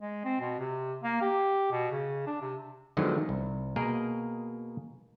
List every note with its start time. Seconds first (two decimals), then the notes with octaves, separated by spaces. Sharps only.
0.01 G#3
0.25 C4
0.40 B2
0.59 C3
1.03 A#3
1.21 G4
1.71 B2
1.91 C#3
2.26 D4
2.41 C3
2.97 D3 D#3 F3 F#3 G#3 B3
3.29 C2
3.76 B2 A#3 G#4 A#4 D#5